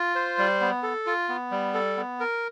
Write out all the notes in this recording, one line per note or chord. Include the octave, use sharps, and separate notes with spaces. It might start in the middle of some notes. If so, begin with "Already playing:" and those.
Already playing: F4
C5
G3
B3
A4
F4
B3
G3
A4
B3
A#4